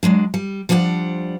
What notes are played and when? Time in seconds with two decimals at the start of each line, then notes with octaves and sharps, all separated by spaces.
0.03 F#3 G#3 D4
0.34 G3
0.69 F3 G3 D4 D5 F#5